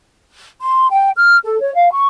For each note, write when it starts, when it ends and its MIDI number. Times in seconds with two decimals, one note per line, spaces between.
0.61 0.86 84
0.91 1.08 79
1.16 1.37 89
1.44 1.59 69
1.60 1.73 73
1.74 1.91 77
1.92 2.06 85